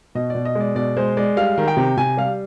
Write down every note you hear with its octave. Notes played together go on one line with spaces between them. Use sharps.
B2 D#5
B2 D5
D#5
G#3 D5
B2 D5
G#3 C5
G#3 D5
G3 F5
D#3
G5
C3
C3 G#5
G3 F5